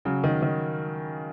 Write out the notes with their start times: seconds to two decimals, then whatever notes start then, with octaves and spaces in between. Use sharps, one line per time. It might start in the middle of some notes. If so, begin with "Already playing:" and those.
0.05 C#3 F#3
0.24 D#3
0.43 D#3